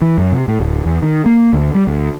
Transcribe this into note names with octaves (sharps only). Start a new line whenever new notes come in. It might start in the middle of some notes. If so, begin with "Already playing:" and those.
E3
F#2
C3
A2
D1
E2
D#3
A#3
D2
G3
D2